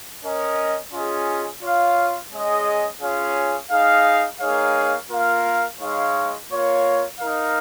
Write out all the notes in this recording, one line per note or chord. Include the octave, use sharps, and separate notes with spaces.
C#4 A#4 D#5
C#4 F4 G#4 D#5
F4 C#5 F5
G#3 C#4 G#4 D#5
C#4 F4 G#4 C#5 F5
D#4 G#4 F5
A#3 D#4 G#4 C#5 F5
A#3 F4 A#4 F5
G#3 D#4 C#5 F5
A#3 F4 C#5 F5
D#4 A#4 F5